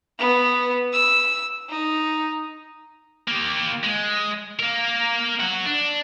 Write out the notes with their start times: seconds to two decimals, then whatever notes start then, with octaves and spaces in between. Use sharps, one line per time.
0.19 B3
0.93 E6
1.69 D#4
3.28 A#3 G4
3.83 G#3
4.59 A#3 A#4
5.40 F#3 F#4
5.66 D4